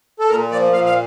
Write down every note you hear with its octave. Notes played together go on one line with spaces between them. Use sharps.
A4
A#2 A#4
F3 D5
A#2 F5
F5